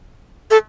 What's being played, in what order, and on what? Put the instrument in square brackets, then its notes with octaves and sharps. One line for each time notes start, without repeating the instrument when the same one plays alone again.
[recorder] A4